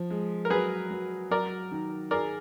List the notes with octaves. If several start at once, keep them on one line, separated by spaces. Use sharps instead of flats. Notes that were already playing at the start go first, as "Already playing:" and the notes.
Already playing: F3
G#3
A#4
F#3 G#4 B4
F#3
F#3 A#4 D5
D#3
G#4 A#4 D5